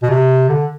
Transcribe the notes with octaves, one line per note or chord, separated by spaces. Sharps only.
B2
C3
D3